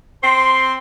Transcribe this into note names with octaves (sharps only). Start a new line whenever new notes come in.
C4 C5 C6